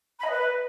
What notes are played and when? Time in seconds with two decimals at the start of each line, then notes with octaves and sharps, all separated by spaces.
0.19 B5
0.25 D#5
0.30 B4